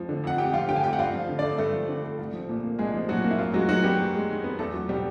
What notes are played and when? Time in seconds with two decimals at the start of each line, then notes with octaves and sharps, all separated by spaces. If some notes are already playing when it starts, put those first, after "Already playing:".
Already playing: F2 F3
0.09 D3
0.24 F2 F#5
0.38 F2 G4 G5
0.53 F3 F4 F5
0.69 D3 G4 G5
0.76 G#5
0.84 F2 G4 G5
0.93 F#5
0.99 G2 F4 F5
1.14 F3
1.29 D3
1.39 A3 D4 D5
1.58 G2 A3 A4
1.73 F3
1.88 D3
2.04 A3
2.19 C2
2.34 F3
2.49 A#2
2.64 A#3
2.79 C2 G#3 G#4
2.94 F3
3.09 A#2 F#3 F#4
3.24 A#3
3.31 E4
3.38 F#2 F4
3.54 F#3 G#3 F#4
3.69 D#3 F#3 F#4
3.84 G3 B3 G4
3.99 F#2
4.14 G#3
4.29 D#3
4.44 B3
4.59 E2 A3 A4
4.74 F#3
4.89 B2 G3 G4